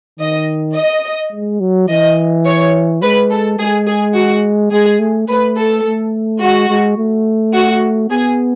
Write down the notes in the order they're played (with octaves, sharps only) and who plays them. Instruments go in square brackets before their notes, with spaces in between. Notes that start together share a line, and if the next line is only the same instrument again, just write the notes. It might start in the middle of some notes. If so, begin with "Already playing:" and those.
[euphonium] D#3 [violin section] D#5
[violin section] D#5
[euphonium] G#3
F#3
[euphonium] E3 [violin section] D#5
[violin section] C#5
[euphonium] G#3 [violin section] B4
[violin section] A4
[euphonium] G#3 [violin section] G#4
[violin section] G#4
F#4
[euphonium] G#3 [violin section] G#4
[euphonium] A3
[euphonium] A3 [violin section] B4
[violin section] A4
[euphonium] A3
[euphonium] G#3 [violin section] F#4
[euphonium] G#3
A3
[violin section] F#4
[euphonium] B3 [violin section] G#4